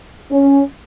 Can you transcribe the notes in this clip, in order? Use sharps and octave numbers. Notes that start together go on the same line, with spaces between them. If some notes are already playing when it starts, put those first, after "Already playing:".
C#4